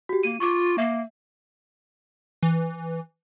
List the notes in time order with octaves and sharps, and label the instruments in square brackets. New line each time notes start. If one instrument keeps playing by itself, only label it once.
[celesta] F#4 G4
[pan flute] A#3 [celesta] D#7
[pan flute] F4 [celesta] C#6 D6
[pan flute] A#3 [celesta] E5
[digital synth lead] E3